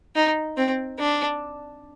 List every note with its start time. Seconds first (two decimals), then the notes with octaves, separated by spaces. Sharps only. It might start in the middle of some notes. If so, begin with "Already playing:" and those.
0.16 D#4
0.57 C4
0.99 D4